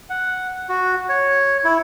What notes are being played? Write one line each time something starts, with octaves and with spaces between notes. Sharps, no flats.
F#5
F#4
C#5
E4